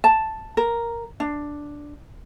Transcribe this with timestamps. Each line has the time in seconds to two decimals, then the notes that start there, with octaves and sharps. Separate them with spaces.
0.04 A5
0.57 A#4
1.20 D4